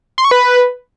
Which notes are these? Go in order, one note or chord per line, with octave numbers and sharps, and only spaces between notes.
C6
C#6
B4